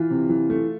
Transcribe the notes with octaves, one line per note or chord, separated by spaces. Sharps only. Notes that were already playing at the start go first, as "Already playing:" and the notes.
Already playing: E3 F4
C3
E3
A3